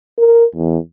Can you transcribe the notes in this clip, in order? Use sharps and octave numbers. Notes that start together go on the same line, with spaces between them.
A#4
E2